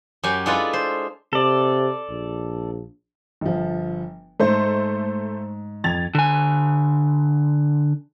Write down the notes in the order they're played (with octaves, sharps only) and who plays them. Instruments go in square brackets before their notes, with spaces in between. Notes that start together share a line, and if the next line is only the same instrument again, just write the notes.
[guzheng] F#2 C#4 G4 G5 G#5
G#3 D4 E4 F4 A4 B4
C5
[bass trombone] C3 [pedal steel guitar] A4 D5
[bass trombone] A#1
[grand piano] G1 F3
[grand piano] G#2 [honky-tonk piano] A3 C5
[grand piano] F2 [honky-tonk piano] G#6 A6 F7
[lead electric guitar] D3 G#5